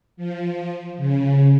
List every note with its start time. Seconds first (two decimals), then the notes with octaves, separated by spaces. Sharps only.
0.17 F3
0.97 C#3